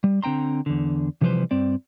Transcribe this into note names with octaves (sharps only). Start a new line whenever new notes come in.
G3
D3 C4 G5 A#5 C6
E2 D3
C3 E3 F3 G3 B4 C5
G2 C4 D5